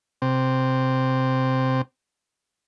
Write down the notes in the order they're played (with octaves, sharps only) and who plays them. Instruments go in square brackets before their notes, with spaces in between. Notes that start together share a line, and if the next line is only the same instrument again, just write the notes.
[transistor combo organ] C3 C4